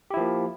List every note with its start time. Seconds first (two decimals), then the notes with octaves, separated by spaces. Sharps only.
0.11 G4
0.14 E4
0.17 F3
0.20 A#3